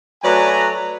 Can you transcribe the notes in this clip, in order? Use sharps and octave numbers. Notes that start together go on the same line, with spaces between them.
F#3 A3 B4 D5 G#5 A#5